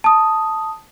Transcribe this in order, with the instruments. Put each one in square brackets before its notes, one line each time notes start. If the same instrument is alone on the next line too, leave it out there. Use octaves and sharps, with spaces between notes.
[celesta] A5 D#6